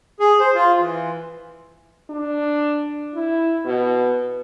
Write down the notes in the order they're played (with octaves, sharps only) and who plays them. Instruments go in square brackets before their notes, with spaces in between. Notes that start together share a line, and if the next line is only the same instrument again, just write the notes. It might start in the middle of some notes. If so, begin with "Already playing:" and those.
[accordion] G#4
C5
F4
E3
[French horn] D4
E4
B2